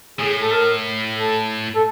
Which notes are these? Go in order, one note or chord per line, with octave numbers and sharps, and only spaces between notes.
A2 G#4
A4
A#4
A4
A4